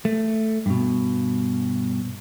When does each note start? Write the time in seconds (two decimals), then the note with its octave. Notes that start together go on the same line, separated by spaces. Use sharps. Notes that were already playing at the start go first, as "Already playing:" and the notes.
0.05 A3
0.66 G2 B2